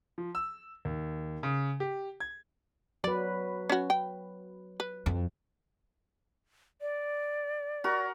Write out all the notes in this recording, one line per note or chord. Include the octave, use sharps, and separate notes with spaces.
F3
E6
D#2
C#3
G4
G#6
F#3 B4 D5
C#4 F#4
G5
B4
F2
D5
F#4 A#4